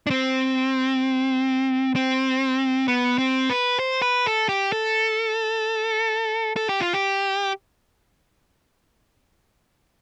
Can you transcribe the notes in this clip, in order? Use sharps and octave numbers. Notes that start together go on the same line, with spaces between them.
D4
C4
C4
B3
C4
B4
C5
B4
A4
G4
A4
A4
G4
F4
G4